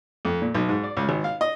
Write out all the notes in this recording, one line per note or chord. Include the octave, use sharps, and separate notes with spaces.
F2
A#2
B1
G#2
D5
C#2
G#1
F5
D#5